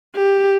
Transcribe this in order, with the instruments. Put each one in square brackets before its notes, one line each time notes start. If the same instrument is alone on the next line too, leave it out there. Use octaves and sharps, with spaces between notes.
[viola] G4